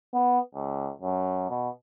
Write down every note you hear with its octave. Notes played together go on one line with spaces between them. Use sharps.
B3
C#2
F#2
B2